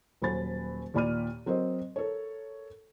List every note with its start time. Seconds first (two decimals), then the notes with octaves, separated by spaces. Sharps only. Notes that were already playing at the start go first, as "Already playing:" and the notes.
0.22 D#1 F#3 C5 G#5 B5 A6
0.94 D#2 A#2 D5 B5 F6 D#7
1.46 F#3 C4 A#4 C5 D#5
1.96 A4 A#4 C#5